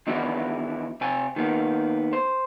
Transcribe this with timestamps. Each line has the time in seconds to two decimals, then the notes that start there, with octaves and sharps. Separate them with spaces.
0.07 D#3 E3 B3 D4 E4 F#4
1.01 C3 G5 G#5
1.36 D#3 A#3 B3
2.13 C5